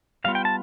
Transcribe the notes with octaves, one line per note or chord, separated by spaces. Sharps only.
A2 G3 B3 F4 F5
G5
A5